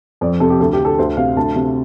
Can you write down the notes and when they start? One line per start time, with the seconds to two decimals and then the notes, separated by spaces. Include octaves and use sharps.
0.21 F2 D5
0.40 C3 A4
0.50 G4
0.60 D2 A4
0.73 G4
0.80 D3
0.85 A4
0.99 D2 C5
1.17 C3 F5
1.36 D2 A5
1.55 C3